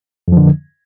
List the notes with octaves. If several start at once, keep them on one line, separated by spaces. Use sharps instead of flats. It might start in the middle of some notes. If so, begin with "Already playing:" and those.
F2 D3 F3